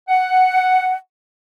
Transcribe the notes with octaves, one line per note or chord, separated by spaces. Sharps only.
F#5